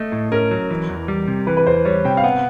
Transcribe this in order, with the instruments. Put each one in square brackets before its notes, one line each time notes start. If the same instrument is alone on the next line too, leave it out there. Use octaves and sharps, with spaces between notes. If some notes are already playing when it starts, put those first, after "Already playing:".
Already playing: [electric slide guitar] A3 [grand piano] D#5
[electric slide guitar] A2
[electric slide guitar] C#4 [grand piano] A#4
[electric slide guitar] F#3
E3
E2
G3
C3
[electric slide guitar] E3 [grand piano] B4
[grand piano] B4
[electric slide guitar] E2 [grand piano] C5
[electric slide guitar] G3 [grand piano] C#5
[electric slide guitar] C3 [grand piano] G5
[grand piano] F5
[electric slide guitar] B3 [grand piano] F#5